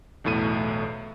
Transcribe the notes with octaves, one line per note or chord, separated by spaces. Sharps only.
B1 E2 A2 A3 D#7